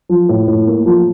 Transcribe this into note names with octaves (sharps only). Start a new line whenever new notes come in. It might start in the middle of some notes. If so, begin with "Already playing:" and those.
F3
A2
A2
A#3
F3